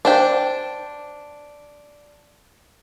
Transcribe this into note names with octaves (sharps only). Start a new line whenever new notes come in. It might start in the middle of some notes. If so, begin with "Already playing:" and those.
D4 C5 G5